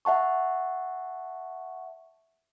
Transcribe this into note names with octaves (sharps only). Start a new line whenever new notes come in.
E5 F#5 A5 C#6